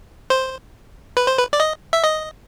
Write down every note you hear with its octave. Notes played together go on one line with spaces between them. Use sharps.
C5
B4
C5
B4
D5
D#5
E5
D#5